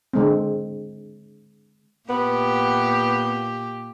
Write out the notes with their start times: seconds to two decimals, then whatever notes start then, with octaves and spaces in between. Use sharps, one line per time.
0.14 D3 G#3 C4
2.10 A#2 B3 G4